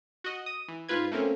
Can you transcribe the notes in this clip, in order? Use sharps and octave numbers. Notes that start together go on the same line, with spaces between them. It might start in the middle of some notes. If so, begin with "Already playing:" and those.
F#4 D#5
D#6
E3
G#2 F4 B4 G#6
A3 A#3 C4 C#4